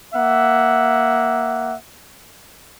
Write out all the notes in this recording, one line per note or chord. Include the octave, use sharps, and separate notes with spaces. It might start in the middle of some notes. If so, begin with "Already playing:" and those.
A#3 E5 F#5